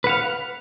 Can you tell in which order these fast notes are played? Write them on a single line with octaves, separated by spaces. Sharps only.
B4 F#5 F5